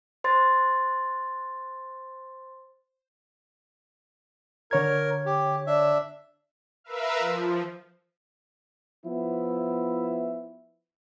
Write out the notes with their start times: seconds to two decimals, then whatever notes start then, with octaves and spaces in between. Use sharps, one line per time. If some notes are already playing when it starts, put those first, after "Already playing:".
0.24 C5 C6 A6
4.71 D3 A#4 C#5 G#6
5.26 G4
5.67 D4 E5
6.84 A#4 B4 E5 F5
7.18 F3
9.06 F3 B3 E4